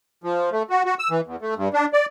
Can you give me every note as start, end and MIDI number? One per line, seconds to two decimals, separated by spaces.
0.24 0.50 53
0.52 0.63 57
0.70 0.83 66
0.86 0.94 66
0.99 1.10 88
1.10 1.21 52
1.27 1.36 40
1.42 1.54 57
1.57 1.68 43
1.73 1.85 62
1.93 2.06 74